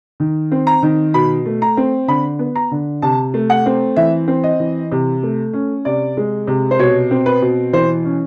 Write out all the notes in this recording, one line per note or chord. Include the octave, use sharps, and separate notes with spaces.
D#3
C4
A#5
D#3
B2 B5
A3
A#5
C4
D3 B5
B3
A#5
D3
C3 A5
A3
F#5
C4
E3 E5
C4
D#5
E3
C3
A3
C#4
C3 D5
G#3
C3
C5
B2 C#5
C4
B4
B2
E3 C5
C#4